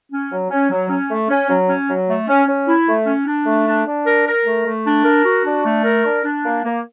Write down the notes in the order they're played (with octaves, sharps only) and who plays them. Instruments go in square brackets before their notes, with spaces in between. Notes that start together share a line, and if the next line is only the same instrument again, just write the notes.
[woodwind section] C#4
F#3
C#4
F#3
C#4
A3
C#4
F#3
C#4
F#3
A3
C#4
C#4
E4
A3
C#4
D4
A3
D4
D4
A#4
A#4
A3
A3
D4
A#4
F#4
D4
A3
A#4
D4
D4
A#3
A#3